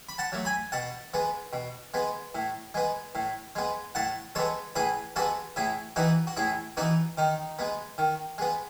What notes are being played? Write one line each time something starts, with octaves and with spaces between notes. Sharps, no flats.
B5
F#5 A5
F#3 A3
G#5 B5
B2 F#5 A5
G#3 B3
B2
G#3 B3
A2
G#3 B3
A2
G#3 B3
A2 F#5 A5
G#3 B3 A4 C#5
A2 G#4 B4
G#3 B3 F#4 A4
A2 E4 G#4
E3 B3 D#4 F#4
F#4
A2 E4 G#4
E3 B3 D#4 F#4
D#3 D#4
G#3 B3
D#3
G#3 B3